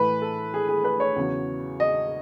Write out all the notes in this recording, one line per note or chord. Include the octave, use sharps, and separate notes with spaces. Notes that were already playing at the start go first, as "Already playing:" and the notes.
Already playing: A2 E3 B4
A4
G#4
G#4
B4
C#5
E2 C#3 F#3
D#5